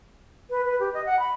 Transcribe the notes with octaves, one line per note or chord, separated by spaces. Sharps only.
B4
B4
G4
D#5
F#5
B5